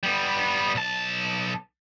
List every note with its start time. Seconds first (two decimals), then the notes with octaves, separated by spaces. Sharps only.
0.03 G3 B3
0.75 B1 A5